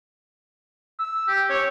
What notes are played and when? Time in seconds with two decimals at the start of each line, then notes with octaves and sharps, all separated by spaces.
0.99 E6
1.28 G4
1.50 C#5